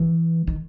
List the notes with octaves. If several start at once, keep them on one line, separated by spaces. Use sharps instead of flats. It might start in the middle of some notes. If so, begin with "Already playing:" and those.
Already playing: E3
D#3